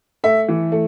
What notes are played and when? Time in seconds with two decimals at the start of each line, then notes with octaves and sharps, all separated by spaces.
0.24 A3 E5
0.49 E3
0.72 A3